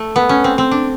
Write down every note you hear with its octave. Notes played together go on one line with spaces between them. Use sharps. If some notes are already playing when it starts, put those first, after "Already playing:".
Already playing: A3
B3
C#4
C4
C4
D4